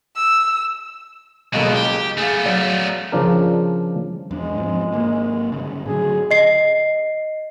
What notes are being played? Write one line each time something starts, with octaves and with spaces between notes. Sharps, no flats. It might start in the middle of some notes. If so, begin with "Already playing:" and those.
E6
F#1 C#2 B2 D#5
G4
A3 B3 G#4 F5
F#3 D5 F5
C#3 F3 D4 A#4
E2 G#3 D4
G#2 F3 C4
G#1 B2 A#3
G1 C#3
A2 D3 F#3 G#4
D#5 C7